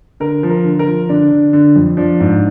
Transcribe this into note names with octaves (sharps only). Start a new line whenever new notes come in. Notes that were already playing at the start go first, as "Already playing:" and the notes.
D3 A#4
F3
A#4
D3
A#4
F3
D3 D4
D3
D3
F2
F3 D4
G#2